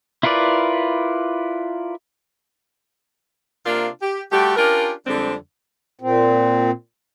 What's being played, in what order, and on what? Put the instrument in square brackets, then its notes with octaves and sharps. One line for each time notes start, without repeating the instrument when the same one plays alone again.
[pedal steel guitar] E4 F4 A#4 B4 D5
[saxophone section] C3 A#3 D4 F4 A#4 F5
G4
G3 A3 F#4 G4
C#4 D4 F4 G4 A#4
F2 D3 G3 G#3 C4 D4
[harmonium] A#2 C4